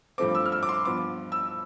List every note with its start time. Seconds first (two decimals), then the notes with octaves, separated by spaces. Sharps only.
0.18 G2 F3 A3 C4 D6
0.35 E6
0.46 F6
0.52 E6
0.63 D6
0.69 C6
0.85 G2 F3 B3 D6
1.32 E6